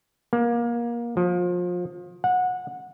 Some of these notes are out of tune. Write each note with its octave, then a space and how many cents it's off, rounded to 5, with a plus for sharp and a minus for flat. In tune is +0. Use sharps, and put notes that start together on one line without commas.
A#3 +25
F3 +30
F#5 -20